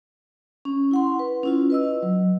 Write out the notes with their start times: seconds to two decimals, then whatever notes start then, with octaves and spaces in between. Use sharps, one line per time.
0.65 C#4
0.91 E4 F#5 C6
1.19 B4
1.43 C#4 E4 F4
1.70 B4 D#5 E6
2.02 F#3